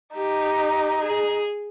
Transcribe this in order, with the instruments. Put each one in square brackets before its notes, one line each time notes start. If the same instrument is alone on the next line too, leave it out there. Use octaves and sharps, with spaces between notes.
[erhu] D#4 [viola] G4
[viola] G#4